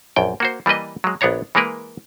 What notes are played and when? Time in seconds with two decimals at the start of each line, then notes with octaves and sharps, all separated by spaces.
0.16 A#1 F#2 G5
0.40 A#3 F#4 C5
0.66 E3 G3 A#3 B4 D#5
1.04 F#3 G#3
1.21 A#1 B3 D4 C#5 A#5
1.55 E3 G#3 A#3 A#4 B4